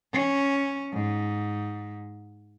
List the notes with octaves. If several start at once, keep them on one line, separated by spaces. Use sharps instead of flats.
C#4
G#2